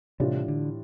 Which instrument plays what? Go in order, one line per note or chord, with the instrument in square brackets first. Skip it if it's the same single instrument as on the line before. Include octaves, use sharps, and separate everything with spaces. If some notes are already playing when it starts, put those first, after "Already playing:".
[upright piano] A2 E3 G3 D4 F4 [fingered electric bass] C3
[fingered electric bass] D3